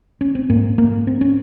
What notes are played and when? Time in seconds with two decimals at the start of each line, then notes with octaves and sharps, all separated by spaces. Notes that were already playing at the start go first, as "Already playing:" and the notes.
0.21 C#4
0.35 C4
0.49 G#2 A#3
0.78 A#3
1.07 C4
1.21 C#4